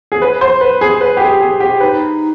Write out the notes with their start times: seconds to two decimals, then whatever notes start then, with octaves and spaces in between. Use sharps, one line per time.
0.12 G#4
0.22 B4
0.41 C5
0.61 B4
0.81 G#4
1.01 B4
1.17 G4
1.21 G#4
1.40 G#4
1.60 G4
1.80 D#4 B4